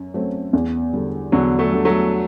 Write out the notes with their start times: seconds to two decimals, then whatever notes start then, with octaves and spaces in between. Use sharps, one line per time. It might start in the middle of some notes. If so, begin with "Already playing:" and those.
Already playing: F#2 F#3
0.14 F#3 A3 C4
0.53 E2
0.93 D3 G3
1.32 E2 D3 F#3
1.59 F#3 A3
1.71 D3 G3
1.85 F#3 A3